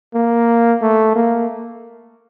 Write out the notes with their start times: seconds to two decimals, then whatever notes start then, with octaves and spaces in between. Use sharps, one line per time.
0.14 A#3
0.82 A3
1.16 A#3